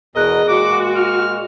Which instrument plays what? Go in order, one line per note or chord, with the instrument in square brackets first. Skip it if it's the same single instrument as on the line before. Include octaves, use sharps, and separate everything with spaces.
[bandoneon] E2 B2 A#4 [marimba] G#4 F#6 [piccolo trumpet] D#5
[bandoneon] A#2 G#3 [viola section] F#4 [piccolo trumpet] D6
[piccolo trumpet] F6